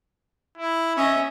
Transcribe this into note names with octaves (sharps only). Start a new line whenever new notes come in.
E4
C#4 D#5 E5